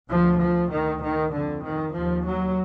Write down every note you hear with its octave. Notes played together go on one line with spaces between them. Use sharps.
D2 F3
F3
D2 D#3
D#3
F2 D3
D#3
D#2 F3
F#3